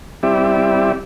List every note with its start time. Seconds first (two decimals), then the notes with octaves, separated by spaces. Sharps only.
0.23 G3 C4 E4 G4 D5 E5